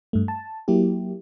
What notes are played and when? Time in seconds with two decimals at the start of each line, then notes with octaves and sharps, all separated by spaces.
0.13 G2 A3
0.28 A5
0.68 F#3 A#3 E4 G4